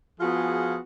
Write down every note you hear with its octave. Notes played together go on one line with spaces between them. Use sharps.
F3 B3 F4 F#4 G#4